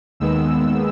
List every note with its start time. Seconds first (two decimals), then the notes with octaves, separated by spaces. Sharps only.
0.20 D#2 D#3 G#3 B3 E6